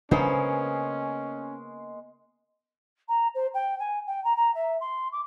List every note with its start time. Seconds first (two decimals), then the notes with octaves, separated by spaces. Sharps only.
0.11 C#3 G#3 A#3 B3 C#4 D4 C5
3.08 A#5
3.34 C5
3.54 G5
3.79 G#5
4.07 G5
4.24 A#5
4.36 A#5
4.54 E5
4.80 C6
5.12 D6